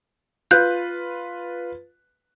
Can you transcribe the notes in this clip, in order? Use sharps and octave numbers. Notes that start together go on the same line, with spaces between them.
F4 B4 F#6 G6